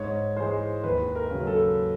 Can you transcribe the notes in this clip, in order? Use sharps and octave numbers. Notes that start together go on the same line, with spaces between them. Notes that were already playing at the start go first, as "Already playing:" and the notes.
Already playing: G#2 C#5
E3 G#3 C5
D#2 B4
A#4
C#3 F#3
A4